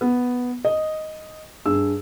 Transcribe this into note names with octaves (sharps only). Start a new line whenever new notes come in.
B3
D#5
G2 G#4 E6